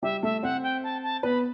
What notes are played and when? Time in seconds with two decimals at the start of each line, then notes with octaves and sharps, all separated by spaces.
0.03 G3 G4 E5
0.23 A3 A4 E5
0.43 C4 C5 F#5
0.63 G5
0.83 A5
1.03 A5
1.23 B3 B4 B5